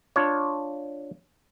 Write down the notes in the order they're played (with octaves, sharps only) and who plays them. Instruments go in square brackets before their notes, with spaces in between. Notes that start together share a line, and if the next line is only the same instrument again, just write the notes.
[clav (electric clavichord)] D4 F4 C#5